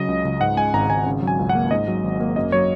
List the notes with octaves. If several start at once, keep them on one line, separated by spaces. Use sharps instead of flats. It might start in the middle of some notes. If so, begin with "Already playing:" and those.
Already playing: C#3 F#3 D#5
C#2
C#2
G#2 F#5
G#3 G#5
G#1 A#5
G#1 G#5
C#3
F#3
G#5
C#2
F#5
A#3
G#2 D#5
F#3
G#1
A#3
F#2 D#5
F#3 C#5